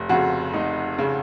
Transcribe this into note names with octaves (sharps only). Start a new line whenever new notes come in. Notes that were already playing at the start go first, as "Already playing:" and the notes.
Already playing: F1
F2 C#3 F#4
F1 D#4
C#3